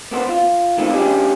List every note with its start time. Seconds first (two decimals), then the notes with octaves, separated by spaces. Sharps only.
0.11 A#3 B3 A4 C5
0.29 F4
0.77 D#3 A3 A#3 C4 F4
0.94 G3 C#4 D4 G4 G#4